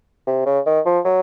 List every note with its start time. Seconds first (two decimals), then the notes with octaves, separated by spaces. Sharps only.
0.27 C3
0.46 C#3
0.66 D#3
0.86 F3
1.05 F#3